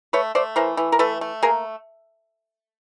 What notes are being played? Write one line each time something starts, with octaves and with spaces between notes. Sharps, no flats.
A3 B4 C#5
A3 C5 D5
E3 A#4 C5
E3
A#4
A3 A4 B4
A3
A#3 G#4 A#4